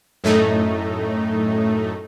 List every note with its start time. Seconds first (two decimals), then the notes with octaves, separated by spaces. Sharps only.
0.24 F#2 A2 A3 D#4